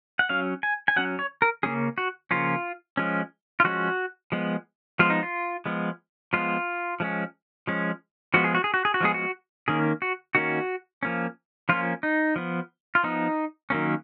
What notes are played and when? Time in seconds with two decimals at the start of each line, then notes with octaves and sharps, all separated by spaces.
0.19 F#5
0.29 F#3 C#4 F5
0.63 G#5
0.88 G#5
0.96 F#3 C#4 F#5
1.19 C#5
1.42 A#4
1.63 C#3 F3 A#3 C#4 G#4
1.98 F#4
2.31 C#3 F3 A#3 C#4 F4
2.97 F3 G#3 C#4
3.60 F4
3.64 F3 G#3 C#4 F#4
4.32 F3 G#3 B3
4.99 F3 G#3 B3 F4
5.10 D#4
5.23 F4
5.66 F3 G#3 B3
6.33 F3 G#3 B3 F4
7.00 F3 G#3 C#4
7.67 F3 G#3 C#4
8.34 F3 G#3 B3 F#4
8.44 G#4
8.55 F#4
8.64 G#4
8.74 F#4
8.85 G#4
8.94 F#4
9.01 F3 G#3 B3 G#4
9.14 F#4
9.68 D#3 A#3 C#4 G#4
10.02 F#4
10.35 D#3 A#3 C#4 F#4
11.03 F3 A#3 C#4
11.69 F3 A#3 C#4 F4
12.03 D#4
12.36 F3 B3
12.95 F4
13.03 F3 B3 D#4
13.70 D#3 F#3 A#3 C#4